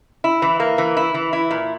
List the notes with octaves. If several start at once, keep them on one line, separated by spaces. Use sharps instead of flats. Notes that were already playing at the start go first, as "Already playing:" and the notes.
E4
E3
A#3
E3
E4
E3
E4
A#2